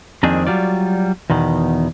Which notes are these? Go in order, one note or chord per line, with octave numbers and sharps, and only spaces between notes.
F2 D#3 A#3 C4 D4 G#4
F#3 G3 F4 D5
E2 B2 D#3